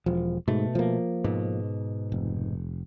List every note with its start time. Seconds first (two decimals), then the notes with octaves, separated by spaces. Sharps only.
0.06 E1 F3
0.48 G#2 B2 A3
0.75 F3 A#3
1.24 G#2 B2
2.12 F1